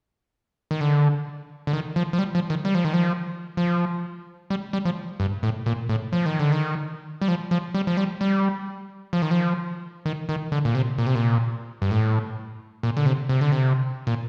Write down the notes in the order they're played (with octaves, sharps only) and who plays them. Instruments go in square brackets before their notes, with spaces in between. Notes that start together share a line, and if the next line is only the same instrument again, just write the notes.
[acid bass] D#3
D3
D3
D#3
F3
F3
G3
F3
D#3
G3
F3
D#3
F3
F3
G3
G3
F3
G2
A2
A#2
A2
F3
D#3
D3
D#3
G3
F3
F3
G3
F3
G3
G3
F3
D#3
F3
D#3
D#3
D3
A#2
C3
A#2
C3
A#2
G2
A2
A#2
D3
C3
C3
D3
C3
A#2